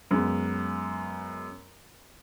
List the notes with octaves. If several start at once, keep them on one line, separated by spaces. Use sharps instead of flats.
F#2 G#3 B3